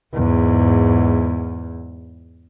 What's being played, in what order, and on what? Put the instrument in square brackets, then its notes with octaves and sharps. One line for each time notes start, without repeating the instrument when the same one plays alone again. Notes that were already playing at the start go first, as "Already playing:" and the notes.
[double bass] E2 G#2